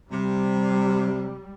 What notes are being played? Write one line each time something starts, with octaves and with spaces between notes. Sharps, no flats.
C3 G3